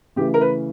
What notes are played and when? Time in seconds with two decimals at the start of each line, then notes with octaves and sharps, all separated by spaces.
0.16 C#3 E3 A3 G4
0.34 A#4
0.41 B4